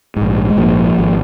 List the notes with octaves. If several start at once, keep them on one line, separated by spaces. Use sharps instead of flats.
A#1 G#2
G#3
A#1 G#2 F3 A#3
G#1